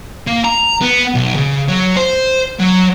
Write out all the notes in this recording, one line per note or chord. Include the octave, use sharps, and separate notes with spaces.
A#3
A#5
B3
B1
C#3
F#3
C5
F#3